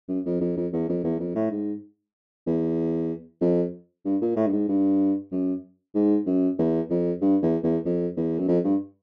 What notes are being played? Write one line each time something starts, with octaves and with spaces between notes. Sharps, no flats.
F#2
F2
F2
F2
E2
F2
E2
F2
A2
G#2
E2
F2
G2
A#2
A2
G2
G#2
G2
F#2
G#2
F#2
E2
F2
G2
E2
E2
F2
E2
F#2
F2
G2